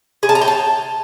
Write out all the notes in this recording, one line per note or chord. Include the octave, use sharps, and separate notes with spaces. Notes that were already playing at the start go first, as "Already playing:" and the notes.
G#4
A5
A#5
G5
A5